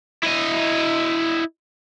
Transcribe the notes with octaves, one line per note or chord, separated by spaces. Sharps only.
E4 D#5